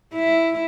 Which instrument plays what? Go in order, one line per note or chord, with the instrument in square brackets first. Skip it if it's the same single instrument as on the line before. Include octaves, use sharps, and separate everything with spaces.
[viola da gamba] E4